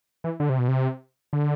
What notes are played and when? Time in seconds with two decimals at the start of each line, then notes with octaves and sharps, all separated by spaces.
0.24 E3
0.40 D3
0.49 C3
0.59 B2
0.68 C3
1.33 D3